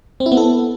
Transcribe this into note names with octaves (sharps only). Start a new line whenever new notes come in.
C4
E4
B3
A4